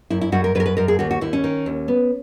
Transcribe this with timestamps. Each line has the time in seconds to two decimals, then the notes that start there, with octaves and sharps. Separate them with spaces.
0.10 F#2 E4
0.21 E4
0.32 F#2 F#4
0.44 A#4
0.55 F#2 B4
0.60 A#4
0.66 B4
0.77 F#2 A#4
0.88 G#4
0.99 D#2 F#4
1.11 F#4
1.21 D#2 E4
1.33 C#4
1.44 D#3
1.66 D#2
1.88 B3